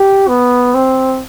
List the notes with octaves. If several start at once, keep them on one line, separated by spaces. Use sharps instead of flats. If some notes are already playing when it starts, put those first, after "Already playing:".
Already playing: G4
B3
C4